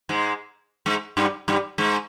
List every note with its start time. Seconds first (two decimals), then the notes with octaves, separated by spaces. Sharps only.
0.09 G#2 G#3
0.86 G#2 G#3
1.17 G2 G3
1.48 G2 G3
1.78 G#2 G#3